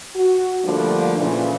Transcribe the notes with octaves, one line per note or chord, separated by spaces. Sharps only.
F#4
D3 F3 G3 A3 A#3 D4
A#2 C#3 E3